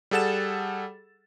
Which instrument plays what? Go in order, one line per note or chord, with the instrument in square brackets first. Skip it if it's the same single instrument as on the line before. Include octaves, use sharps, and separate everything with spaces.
[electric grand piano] G3 G#4 A4 F#5 A6 E7